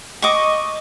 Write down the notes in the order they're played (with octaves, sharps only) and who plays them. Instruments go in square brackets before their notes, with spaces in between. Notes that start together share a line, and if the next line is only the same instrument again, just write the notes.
[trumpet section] D#5 [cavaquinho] C#6 D6